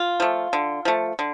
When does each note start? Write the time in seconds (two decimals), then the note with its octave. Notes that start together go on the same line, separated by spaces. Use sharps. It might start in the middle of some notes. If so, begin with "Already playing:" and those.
Already playing: F4
0.20 F3 A3
0.53 D3
0.85 F3 A3
1.19 D3